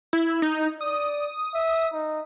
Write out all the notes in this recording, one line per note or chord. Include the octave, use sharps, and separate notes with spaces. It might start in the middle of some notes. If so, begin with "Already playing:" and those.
E4
D#4
D5 D#6
E5
D#4